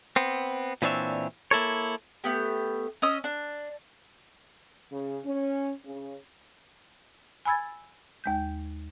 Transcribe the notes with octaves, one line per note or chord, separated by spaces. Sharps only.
B3 C4
A#2 E3 C4 D4 C#5 E5
A#3 E4 A4 C#5
A3 B3 G4
C#4 D#5 E6
D4
C#3
C#4
C#3
G#5 B5 E6 G#6 A6
D#2 G#3 G6